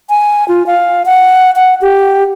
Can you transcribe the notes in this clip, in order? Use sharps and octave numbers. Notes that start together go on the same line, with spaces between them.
G#5
F4
F5
F#5
F#5
G4